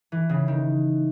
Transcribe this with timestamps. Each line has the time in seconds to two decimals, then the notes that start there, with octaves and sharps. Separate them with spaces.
0.12 E3
0.29 C#3
0.48 D#3